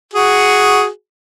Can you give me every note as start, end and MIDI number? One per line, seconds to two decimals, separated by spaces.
0.14 0.88 66
0.14 0.88 68